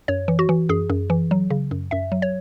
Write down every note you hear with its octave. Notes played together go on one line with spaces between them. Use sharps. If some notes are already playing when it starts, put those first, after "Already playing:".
F#2 C#5
E3
F#4
E3
F#2 G#4
F#2
E3
F#3
C#3
F#2
F#2 E5
F#3
C#5